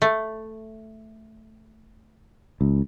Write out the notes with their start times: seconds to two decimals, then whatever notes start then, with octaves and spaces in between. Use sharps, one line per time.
0.02 A3
2.61 C#2